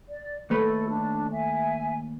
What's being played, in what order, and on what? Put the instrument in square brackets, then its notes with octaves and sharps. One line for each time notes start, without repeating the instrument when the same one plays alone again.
[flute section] D5
[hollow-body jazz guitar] D#2 A3 B4 [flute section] A4
[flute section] D4
E5 G#5